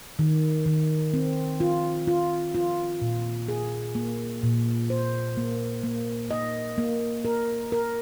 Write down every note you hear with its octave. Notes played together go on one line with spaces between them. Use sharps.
D#3
D#3
C4
F4
F4
F4
A#2
G#4
A#3
A#2
C5
A#3
A#3
D#5
A#3
A#4
A#4